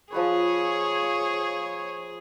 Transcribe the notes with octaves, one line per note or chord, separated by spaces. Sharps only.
F3 G#3 G#4 B4 C#5